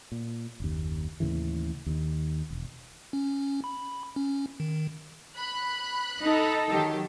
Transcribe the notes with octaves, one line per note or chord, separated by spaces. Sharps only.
A#2
F#1 D#2
D#2 A2 C#3 E3
D#2 D#3
E1
C#4
B5
C#4
D#3
B5 F#6
D#4 A4
D#3 F#3 G4